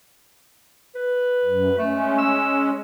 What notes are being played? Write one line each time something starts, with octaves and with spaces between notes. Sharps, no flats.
B4
F#2
G#3 A3 C#4
E6